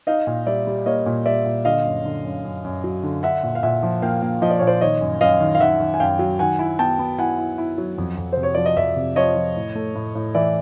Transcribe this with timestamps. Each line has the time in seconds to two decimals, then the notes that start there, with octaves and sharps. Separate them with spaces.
0.07 D#4 D#5 F5
0.27 A#2
0.47 G3 D5 E5
0.67 G3
0.86 A#3 C#5 D#5
1.06 A#2
1.26 G3 D5 E5
1.46 A#2
1.65 D3 D#5 F5
1.85 F#2
2.05 D3
2.25 F#2
2.45 F#2
2.64 F#2
2.84 F#3
3.03 D3
3.23 D4 E5 F#5
3.43 A#2
3.55 F5
3.63 A#2 E5 F#5
3.83 F3
4.02 A#3 F5 G5
4.22 A#3
4.42 F3 D#5
4.50 D5
4.59 A#2 C#5
4.67 C5 D5
4.81 D#3 C#5 D#5
5.01 F#2
5.21 F#2 D#5 F5
5.40 D#3
5.55 F5
5.60 D#3 E5 F#5
5.80 D#3
5.94 G#5
6.00 F#2 F5 G5
6.19 F#3
6.39 D#3 F#5 G#5
6.59 E4
6.79 B3 G5 A5
6.99 B3
7.18 E4 F#5 G#5
7.38 E4
7.58 E4
7.78 F#3
7.98 F2
8.17 F2
8.32 C3 C5
8.43 C#5
8.55 F3 D5
8.66 D#5
8.76 F2 D5 E5
8.96 C3
9.16 F3 C#5 D#5
9.36 F3
9.56 A2
9.75 A3
9.95 A2
10.15 A2
10.35 E3 D5 E5